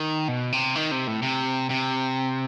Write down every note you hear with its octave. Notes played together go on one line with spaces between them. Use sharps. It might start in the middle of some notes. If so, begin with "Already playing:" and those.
Already playing: D#3
B2
C3
D#3
C3
A2
C3
C3